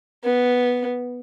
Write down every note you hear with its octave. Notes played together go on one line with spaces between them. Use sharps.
B3